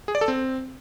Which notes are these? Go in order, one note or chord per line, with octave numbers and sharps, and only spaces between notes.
G#4
D5
A4
C4